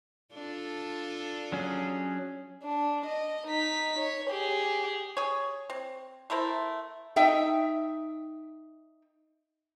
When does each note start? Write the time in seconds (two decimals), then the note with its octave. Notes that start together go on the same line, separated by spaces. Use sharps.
0.33 D4 F4 A4
1.52 F#3 C#4 G#4
2.64 D4
3.06 D#5
3.47 D#4 B6
3.99 C#5
4.30 G4 G#4
5.17 G#4 C#5
5.70 C4
6.30 A3 E4 A#4 C5
7.16 D#4 E5 G5